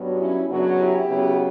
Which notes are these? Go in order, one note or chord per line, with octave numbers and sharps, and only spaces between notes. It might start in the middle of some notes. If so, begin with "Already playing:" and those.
Already playing: G2 F#3 B3
C#4 E4
F#2 C#3 F#3 B3 D4 F#4
E4 G4
C#3 F#3 B3